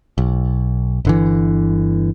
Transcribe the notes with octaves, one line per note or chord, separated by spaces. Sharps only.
B1
G1 D3 E3